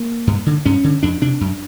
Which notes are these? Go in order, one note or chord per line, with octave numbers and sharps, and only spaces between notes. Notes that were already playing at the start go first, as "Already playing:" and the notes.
Already playing: A#3
G2
D3
G2 C#4
D3
F2 D4
C3 D4
F#2